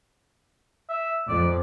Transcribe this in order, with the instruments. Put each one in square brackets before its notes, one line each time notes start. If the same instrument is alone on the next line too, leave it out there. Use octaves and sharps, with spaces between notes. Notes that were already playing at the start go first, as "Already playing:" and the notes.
[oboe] E5
[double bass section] F2 [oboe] D5